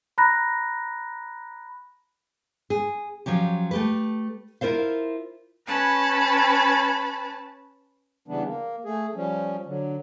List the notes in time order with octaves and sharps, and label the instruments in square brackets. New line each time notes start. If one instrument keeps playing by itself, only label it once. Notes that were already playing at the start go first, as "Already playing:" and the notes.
[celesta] A#5 B5 F#6 A#6
[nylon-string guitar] G#4
F3 F#3 C#4 G4
A3 G4 B4
E4 F4 A#4 C5 F5
[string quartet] C#4 B4 A5 B5
[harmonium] C#3 E3 G3 B3 D4
A#3
A3 G#4
F3 G3 C#4
D3 F#3